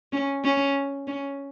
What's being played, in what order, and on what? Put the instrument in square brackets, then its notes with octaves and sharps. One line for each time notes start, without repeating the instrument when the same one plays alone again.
[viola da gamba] C#4
C#4
C#4